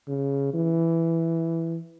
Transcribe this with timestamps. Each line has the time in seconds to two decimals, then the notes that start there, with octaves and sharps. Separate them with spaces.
0.08 C#3
0.54 E3